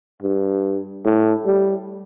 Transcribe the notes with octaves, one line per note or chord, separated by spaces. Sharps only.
G2
A2
G3